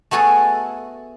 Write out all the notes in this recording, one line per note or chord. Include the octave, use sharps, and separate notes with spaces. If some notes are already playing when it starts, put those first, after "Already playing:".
A3 B3 F#4 G#4 A4